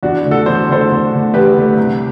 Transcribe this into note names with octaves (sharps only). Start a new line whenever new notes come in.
E2 D4 F#4
D3 A3
F#4 A4
E2 C5
D3 A3 A4 C5
E2
D3 A3
E2 G4 B4
D3 A3
C2